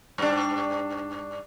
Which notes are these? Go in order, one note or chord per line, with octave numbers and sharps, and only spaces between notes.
G2 D4